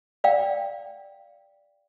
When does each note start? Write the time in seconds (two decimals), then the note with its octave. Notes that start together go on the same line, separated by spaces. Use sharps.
0.24 D5 F5 G5